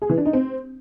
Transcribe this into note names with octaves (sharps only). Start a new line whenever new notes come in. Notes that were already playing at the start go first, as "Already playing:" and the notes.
G#4
E3
D4
D#4
C4